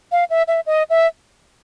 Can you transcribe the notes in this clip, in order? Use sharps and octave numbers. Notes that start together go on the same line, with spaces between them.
F5
E5
E5
D#5
E5